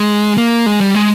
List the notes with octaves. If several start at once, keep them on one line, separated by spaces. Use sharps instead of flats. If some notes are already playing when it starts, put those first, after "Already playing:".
Already playing: G#3
A#3
G#3
G3
G#3